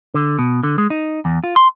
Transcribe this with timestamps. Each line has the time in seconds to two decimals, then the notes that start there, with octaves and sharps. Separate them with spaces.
0.14 D3
0.39 B2
0.63 D3
0.78 G#3
0.90 D#4
1.25 E2
1.44 F4
1.56 C6